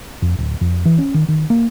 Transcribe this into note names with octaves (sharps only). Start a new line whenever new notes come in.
F2
D1
F2
E3
C#4
D#3
D#3
A#3